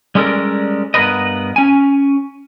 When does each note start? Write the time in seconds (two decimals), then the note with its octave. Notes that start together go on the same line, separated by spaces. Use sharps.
0.15 G3 G#3 C#4 A4 A#4 D5
0.94 G2 B3 G#4 A#4 B4 D#5
1.56 C#4 G#5